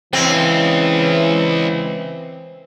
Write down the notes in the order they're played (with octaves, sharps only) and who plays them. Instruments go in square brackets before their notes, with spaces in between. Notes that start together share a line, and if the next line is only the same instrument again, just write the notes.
[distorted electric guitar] C#2 [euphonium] E3 [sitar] C4